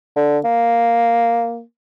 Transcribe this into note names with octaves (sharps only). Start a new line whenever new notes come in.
D3
A#3